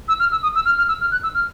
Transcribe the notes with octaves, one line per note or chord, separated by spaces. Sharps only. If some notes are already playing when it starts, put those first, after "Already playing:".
E6
F6
E6
D#6
E6
F6
F6
E6
F6
F#6
E6
F6